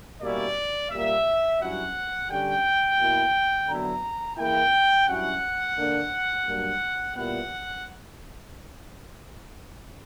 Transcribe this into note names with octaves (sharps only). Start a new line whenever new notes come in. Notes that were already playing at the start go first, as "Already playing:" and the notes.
B2 G3 A#3 C#4 E4 D5
A#2 G3 A#3 E5
G2 F#3 C#4 E4 F#5
D3 G3 C#4 G5
B2 A#3 E4
D3 F#3 B3 E4 A#5
C#3 E3 A#3 E4 G5
G2 F#3 C#4 E4 F#5
D3 A#3 D4
G2 F#3 A#3 D4
A#2 G3 B3 E4 F#5